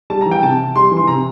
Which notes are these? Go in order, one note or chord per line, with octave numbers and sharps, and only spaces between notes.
G3 A5
A#5
E3
G5
C3 A5
C3
G3 C6
E3
C6
C3 A#5